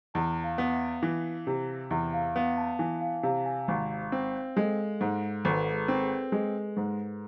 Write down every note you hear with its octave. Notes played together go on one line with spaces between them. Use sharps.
E2 A5
F5
B3
E5
E3
C3
E2 E5
F5
B3 F5
A5
E3 G#5
F5
C3 F5
G#5
G#1 F5
C4
G#3 A4
G#2 G#4
G#1 A4
B4
A4
G#4
C4
G#4
G#3 G#4
G#2